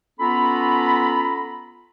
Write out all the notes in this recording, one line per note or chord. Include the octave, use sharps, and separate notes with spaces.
B3 C#4 F4 A4 A#5 B5